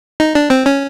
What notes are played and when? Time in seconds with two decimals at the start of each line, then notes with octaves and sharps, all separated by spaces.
0.20 D#4
0.35 D4
0.50 C4
0.66 C#4